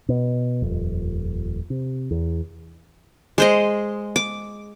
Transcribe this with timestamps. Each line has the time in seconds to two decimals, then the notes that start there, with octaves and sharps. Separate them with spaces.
0.09 B2
0.62 D#1 F2
1.70 C3
2.11 E2
3.38 G#3 C5 D#5
4.16 D6